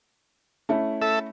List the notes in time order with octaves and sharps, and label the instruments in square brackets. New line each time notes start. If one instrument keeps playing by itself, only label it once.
[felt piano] A3 C#4 E4
[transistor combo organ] A4 E5